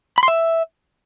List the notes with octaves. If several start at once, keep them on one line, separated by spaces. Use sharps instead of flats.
B5
C6
E5